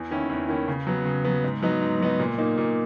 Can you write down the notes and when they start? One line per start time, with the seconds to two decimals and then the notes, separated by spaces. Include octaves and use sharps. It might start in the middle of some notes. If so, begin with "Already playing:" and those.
Already playing: E2
0.11 D#3 A#3 C#4 E4
0.30 E2
0.49 D#3 A#3 C#4 E4
0.68 C#3
0.87 F#3 B3
1.05 C#3
1.25 F#3 B3
1.44 G#2
1.62 F#3 B3 D#4
1.81 G#2
2.00 F#3 B3 D#4
2.19 A#2
2.38 A#3 D#4
2.58 A#2